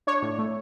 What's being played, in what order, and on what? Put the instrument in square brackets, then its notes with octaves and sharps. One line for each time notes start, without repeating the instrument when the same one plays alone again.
[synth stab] D4 C#5
A2
A3